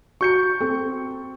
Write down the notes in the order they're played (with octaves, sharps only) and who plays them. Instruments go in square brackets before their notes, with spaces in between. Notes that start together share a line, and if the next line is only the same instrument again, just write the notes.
[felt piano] F#4 A#5 [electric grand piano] C#6 G6 C#7
[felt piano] C4 A4